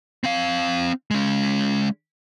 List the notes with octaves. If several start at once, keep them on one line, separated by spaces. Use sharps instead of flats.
C4 F5
G#3 C#4